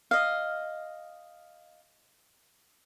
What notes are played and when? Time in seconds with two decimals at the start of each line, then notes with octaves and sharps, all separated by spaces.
0.11 D#5 F5